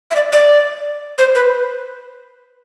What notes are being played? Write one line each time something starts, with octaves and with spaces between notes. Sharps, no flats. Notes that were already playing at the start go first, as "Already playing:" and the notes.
E5
D5
D5
C5
B4